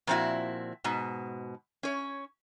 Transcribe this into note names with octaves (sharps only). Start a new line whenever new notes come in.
A#2 F3 C4 C#4 E4 F#4
G#2 B2
C#4 C#5